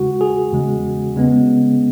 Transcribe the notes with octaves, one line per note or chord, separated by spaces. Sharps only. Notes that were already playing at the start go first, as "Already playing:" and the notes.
Already playing: E2 C#3 G#3 F#4
G#4
E2 C#3 G#3
C#3 G#3 B3